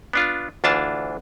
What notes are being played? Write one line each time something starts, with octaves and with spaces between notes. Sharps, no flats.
B3 D4 F4
D2 E3 D4 F4 A5